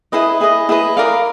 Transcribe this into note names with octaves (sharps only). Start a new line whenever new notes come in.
E4 G#4 B4 D#5
E4 G#4 B4 D#5
E4 G#4 B4 D#5
A#4 D5 F5